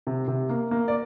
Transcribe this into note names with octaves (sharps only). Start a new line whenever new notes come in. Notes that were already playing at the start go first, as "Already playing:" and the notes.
C3
C3
A#3
A#3
D5